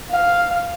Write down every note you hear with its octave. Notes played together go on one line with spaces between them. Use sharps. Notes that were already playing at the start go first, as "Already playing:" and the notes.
F5